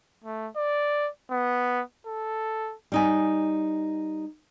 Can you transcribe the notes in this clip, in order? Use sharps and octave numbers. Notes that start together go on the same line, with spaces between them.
A3
D5
B3
A4
G3 D#4 G#5